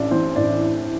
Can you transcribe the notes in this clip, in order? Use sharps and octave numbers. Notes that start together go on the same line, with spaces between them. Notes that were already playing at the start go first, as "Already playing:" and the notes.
Already playing: A1 A2 D4 D5
E3 C4 C5
A2 D4 D5